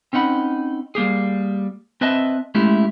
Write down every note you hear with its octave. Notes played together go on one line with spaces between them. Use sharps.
C4 C#4 D#4 F#5 B5
G3 A#3 G4 G#4
C4 B4 D#5 E5 A5
G#3 A3 C#4 E4 G4